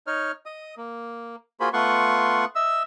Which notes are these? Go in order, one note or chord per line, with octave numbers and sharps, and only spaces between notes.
D#4 C#5 F6
D#5 D#6
A#3
A#3 F4 F#4 G#4 C5 B5
A3 B3 F4 F#5 C6 C#6
D#5 E5 E6